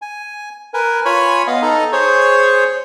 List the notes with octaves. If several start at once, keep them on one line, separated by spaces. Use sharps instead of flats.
G#5
A#4 B4 G#5
F4 C#5 G#5 B5 C#6
B3 D#5 F5
D#4 A4 D#5 A#5
G#4 C5 C#5 C#6